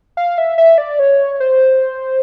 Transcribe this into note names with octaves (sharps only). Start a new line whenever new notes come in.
F5
E5
E5
D5
C#5
C5